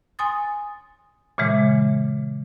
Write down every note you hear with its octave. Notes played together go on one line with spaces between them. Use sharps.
G#5 C6 D#6 A6
A#2 C#3 E3 G#3